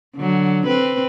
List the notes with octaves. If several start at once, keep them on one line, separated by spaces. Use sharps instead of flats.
D3 F#3
C4 B4